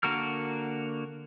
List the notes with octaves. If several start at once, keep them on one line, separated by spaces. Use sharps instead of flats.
D3 A#3 F#4 A#4 F6